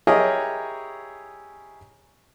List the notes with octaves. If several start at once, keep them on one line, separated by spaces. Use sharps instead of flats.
E4 G4 G#4 A#4 C#5 D#5